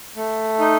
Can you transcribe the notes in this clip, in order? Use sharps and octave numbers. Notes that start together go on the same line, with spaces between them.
A3
D#4